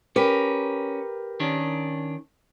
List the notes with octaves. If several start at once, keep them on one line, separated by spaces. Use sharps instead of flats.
C#4 G4 A#4 B4
D#3 C#4 D4